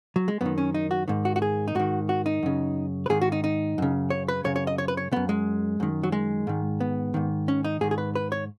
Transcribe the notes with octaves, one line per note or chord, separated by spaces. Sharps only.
F#3
G#3
F#2 D#3 B3
C#4
D#4
F#4
G#2 D#3
F#4
F#4
G#4
D#4
G#2 D#3 F#4
F#4
D#4
F#2 C#3
B4
G#2 D#3 G#4
F#4
D#4
D#4
F#2 C#3
C#5
B4
F#2 C#3 C#5
C#5
D#5
C#5
B4
C#5
F#2 C#3 B3
G#3
F#2 D#3
F#3
G#3
G#2 D#3
B3
G#2 D#3
C#4
D#4
G#2 D#3 G#4
G#4
B4
B4
C#5